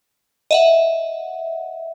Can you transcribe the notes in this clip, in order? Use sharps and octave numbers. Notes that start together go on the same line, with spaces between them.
D#5 E5 F#5